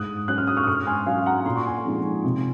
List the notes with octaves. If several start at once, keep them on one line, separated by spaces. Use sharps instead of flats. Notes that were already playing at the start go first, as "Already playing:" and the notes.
Already playing: G#2 D#6 F#6
F#3 C#4 F#6
F6
D#6
C#6 F6
D#6
G#2 C#6 F6
G#5 C6
F#3 C#4 F5 G#5
F#5 A#5
A#2 C6
C#6
G#5 C6
F3 G#3 C4 D#4
C3